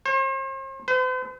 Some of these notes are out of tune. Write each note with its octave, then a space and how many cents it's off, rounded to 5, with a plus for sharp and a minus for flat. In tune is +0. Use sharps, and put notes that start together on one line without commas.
C5 +45
C5 -45